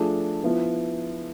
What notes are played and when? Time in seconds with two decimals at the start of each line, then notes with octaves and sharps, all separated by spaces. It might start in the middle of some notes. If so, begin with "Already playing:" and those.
Already playing: F3 A3 D4 G#4
0.43 F3 B3 E4